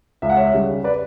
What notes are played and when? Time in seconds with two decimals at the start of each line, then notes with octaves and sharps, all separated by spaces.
0.22 C#2 E5
0.30 F#5
0.37 C#5 E5
0.53 C#3 G3
0.84 B4 D5